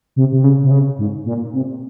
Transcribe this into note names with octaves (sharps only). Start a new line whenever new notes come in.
C3
C3
C#3
C3
C#3
G#2
A#2
C3